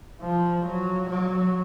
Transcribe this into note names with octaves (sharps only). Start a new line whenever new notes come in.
F3
F#3
F#3